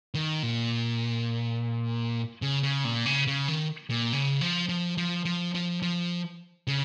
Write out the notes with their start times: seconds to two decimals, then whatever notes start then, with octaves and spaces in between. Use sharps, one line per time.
0.14 D#3
0.43 A#2
2.42 C#3
2.63 C#3
2.84 A#2
3.06 C#3
3.27 C#3
3.48 D#3
3.90 A#2
4.12 C#3
4.41 F3
4.69 F3
4.98 F3
5.25 F3
5.54 F3
5.82 F3
6.67 C#3